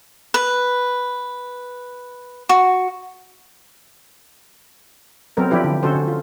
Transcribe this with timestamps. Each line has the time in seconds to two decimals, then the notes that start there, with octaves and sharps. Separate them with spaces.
0.34 B4
2.49 F#4
5.37 F#3 B3 C4 A4 A#4
5.50 F3 D4 E4 G4 B4
5.64 D3
5.83 D3 C#4 F#4 A4 C5
5.95 D3
6.08 F4